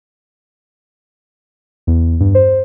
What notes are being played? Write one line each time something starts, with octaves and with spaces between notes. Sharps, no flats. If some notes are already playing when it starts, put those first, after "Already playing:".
E2
G2
C5